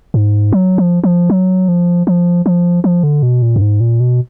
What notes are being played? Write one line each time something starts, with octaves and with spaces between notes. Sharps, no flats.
G#2
F#3
F3
F3
F#3
F3
F3
F3
F3
D3
B2
A#2
F#2
G#2
A#2
B2